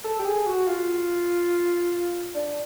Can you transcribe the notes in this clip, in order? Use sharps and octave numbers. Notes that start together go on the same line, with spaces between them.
A4
G4
G#4
F#4
F4
D4